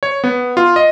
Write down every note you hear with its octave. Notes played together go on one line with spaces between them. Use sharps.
C#5
B3
F4
D#5